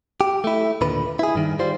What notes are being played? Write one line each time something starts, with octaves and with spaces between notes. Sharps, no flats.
G4
A3 E4
D#2 A#2 D3 B4
E4 G#4
G2 D#3
G3 F4 C5